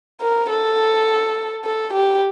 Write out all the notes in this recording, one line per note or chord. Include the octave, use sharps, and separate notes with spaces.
A#4
A4
A4
G4